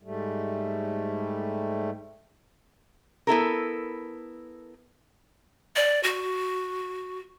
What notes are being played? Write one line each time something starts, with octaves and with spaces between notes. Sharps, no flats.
G#2 G3 A3
B3 E4 A4 A#4
D5
F#4